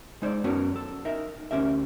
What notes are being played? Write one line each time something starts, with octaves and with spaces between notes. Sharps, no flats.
G#3 D#4 C5 D5
F#2 B3 C#4 F#4 A#4 C#5
A4
D#4 A#4 E5
D2 D#3 C#4 G4 A#4 E5